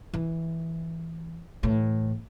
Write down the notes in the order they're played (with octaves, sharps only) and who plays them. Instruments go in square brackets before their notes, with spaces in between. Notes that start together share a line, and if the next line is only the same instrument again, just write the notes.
[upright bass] E3
A2 E3